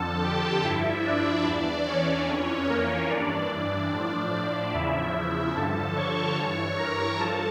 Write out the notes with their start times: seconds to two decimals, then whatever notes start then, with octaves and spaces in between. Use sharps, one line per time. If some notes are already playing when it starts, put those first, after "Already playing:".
Already playing: F2 D3 F3 A4 A5
0.23 G4 G5
0.64 G2 F3 E4 E5
1.05 D4 D5
1.46 E2 E3
1.87 C#4 C#5
2.28 F2 E3
2.68 A#3 A#4
3.09 G2 E3 D4 D5
3.50 D4 D5
3.91 A2 F3
4.32 D4 D5
4.73 E2 C#3 F3 E4 E5
5.14 E4 E5
5.55 G2 D3 F3 A4 A5
5.96 C#5 C#6
6.36 G2 E3 C#5 C#6
6.77 A#4 A#5
7.18 G2 F3 A4 A5